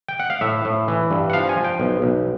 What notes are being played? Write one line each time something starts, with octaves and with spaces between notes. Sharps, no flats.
G5
F#5
F5
A2 E5
A2
E3
G2
F#5
F3 F5
G#5
F3
G5
B1
B1